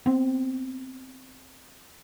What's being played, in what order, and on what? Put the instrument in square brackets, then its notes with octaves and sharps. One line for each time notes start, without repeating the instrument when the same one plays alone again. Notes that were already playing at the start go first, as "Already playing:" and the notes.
[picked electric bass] B3 C4